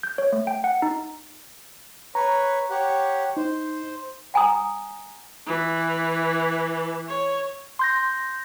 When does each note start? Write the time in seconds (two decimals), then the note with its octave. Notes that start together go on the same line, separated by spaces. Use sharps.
0.03 G6
0.18 C#5
0.33 A3
0.47 G5
0.64 F#5
0.82 D#4
2.15 B4 C#5 A#5
2.70 G4 C#5 F#5
3.37 D#4 C5
4.34 F#5 G#5 A#5 D#6
5.46 E3
7.08 C#5
7.79 C6 G6 A#6